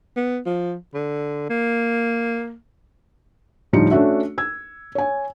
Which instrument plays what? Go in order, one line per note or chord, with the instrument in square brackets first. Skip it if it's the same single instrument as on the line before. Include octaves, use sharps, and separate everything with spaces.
[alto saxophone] B3
F3
D3
A#3
[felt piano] D2 A2 F3 G3 D#4 C#7
A3 C#4 D4 F#4 E5
E6 G#6
C#5 G#5